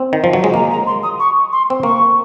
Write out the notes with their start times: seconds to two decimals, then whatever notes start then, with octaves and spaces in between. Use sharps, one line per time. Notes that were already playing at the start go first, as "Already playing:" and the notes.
Already playing: C4
0.13 D#3
0.24 F3
0.33 F#3
0.44 G#3
0.54 A#3 A#5
0.71 A#5
0.86 C6
1.03 D#6
1.19 C#6
1.52 C6
1.70 C4
1.83 A#3 C#6